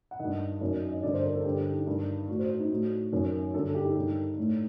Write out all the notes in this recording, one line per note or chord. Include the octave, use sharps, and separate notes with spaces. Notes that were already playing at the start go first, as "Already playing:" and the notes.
F#5
G2 D#3 D#5
F#2 D#3
D#5
G2 D3 D5
C5
A#4
A4
G2 D3 G4
G4
D#4
G2 D#3
A2 F#4
C5
D#4
A2 F#4
F#2 D#3
G2 D3 A4
A4
G4
D#4
G2 D#3
A2